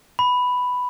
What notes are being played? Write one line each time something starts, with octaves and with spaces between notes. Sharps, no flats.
B5